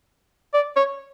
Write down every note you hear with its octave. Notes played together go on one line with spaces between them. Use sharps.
D5
C#5